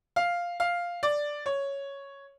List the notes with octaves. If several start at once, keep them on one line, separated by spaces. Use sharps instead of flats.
F5
F5
D5
C#5